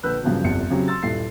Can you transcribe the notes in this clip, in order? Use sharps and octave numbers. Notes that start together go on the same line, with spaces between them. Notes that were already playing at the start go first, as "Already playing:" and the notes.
A#1 D3 B4 E6 F#6 G6
G2 C#3 F3 F#3
G1 C2 F2 C#7
C#3 F#3 C4 G4
C6 E6 A6
D#1 G2 E4 A4 C7